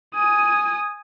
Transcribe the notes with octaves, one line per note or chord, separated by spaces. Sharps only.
G#5 D#6